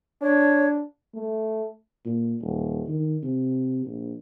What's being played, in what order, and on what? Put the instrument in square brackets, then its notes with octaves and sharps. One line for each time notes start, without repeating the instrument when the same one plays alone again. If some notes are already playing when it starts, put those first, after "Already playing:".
[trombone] D4 [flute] C#5
[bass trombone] A3
[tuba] A#2
D#1
D#3
C3
A#1